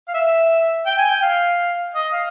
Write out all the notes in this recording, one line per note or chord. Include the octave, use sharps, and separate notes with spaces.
F5
E5
G5
G#5
G5
F5
D#5
F5